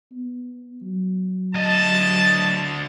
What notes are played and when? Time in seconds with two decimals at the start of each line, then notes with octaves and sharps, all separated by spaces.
0.12 B3
0.82 F#3
1.55 D2 D#5 A5